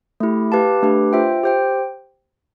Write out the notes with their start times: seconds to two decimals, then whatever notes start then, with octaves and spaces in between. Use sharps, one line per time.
0.20 A3 E4 G4
0.52 G4 B4 F5 A5
0.82 A3 D4 G4 B4
1.13 F4 C5 E5 G5
1.43 G4 C5 G5